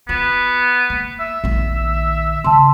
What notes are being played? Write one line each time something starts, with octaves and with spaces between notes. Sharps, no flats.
B3 F4
A#3
E5
A#1 D#3
C#3 A5 C6